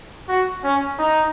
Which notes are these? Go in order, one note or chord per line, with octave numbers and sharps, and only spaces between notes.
F#4
C#4
D#4